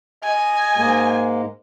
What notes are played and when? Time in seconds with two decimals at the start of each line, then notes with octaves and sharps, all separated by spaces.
0.24 D#5 G#5
0.77 G#2 G#3 A#3